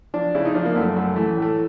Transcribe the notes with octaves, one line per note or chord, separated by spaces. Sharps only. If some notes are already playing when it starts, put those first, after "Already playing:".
F3 D4
C#3 E4
D#4
F3 D4
A#3
F#2 A3
F#2 A3
E3 A3
A2
A3